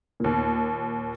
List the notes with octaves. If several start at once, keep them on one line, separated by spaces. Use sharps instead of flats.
D#2 A#2